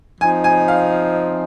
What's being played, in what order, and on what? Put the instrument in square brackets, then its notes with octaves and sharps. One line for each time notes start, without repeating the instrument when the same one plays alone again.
[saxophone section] F3 C4 D#4 [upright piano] G#5
[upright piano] G#5
F5